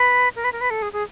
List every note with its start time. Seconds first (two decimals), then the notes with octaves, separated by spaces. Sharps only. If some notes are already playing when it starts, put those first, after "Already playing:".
Already playing: B4
0.36 A#4
0.44 B4
0.52 A#4
0.61 B4
0.70 A4
0.82 G#4
0.93 G#4